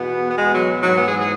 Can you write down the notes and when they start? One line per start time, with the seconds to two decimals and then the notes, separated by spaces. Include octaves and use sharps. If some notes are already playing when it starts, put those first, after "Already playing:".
Already playing: E2 B2 B3
0.30 B3
0.36 G#3
0.52 F#3
0.83 G#2 E3 F#3
0.95 B3
1.07 G#4
1.19 G#4